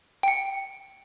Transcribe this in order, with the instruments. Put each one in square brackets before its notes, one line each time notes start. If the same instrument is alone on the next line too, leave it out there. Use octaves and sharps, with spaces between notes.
[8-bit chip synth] G5 C#7